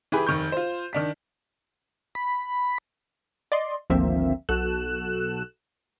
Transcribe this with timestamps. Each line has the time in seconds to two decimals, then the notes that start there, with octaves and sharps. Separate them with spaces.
0.12 E3 G4 G#4 B4
0.27 F1 D#3 C#6 G6
0.52 F4 C5
0.93 D#3 D4 B6
2.15 B5
3.52 D5 D#5 C6
3.90 G#1 D2 F3 A#3 C4 E5
4.49 B1 F#4 A4 F#6 E7